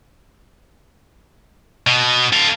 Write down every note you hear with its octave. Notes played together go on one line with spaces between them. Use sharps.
B2
A4 F5